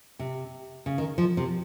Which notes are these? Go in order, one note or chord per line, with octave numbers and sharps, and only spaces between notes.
C3
C#3
D#3
F3
C3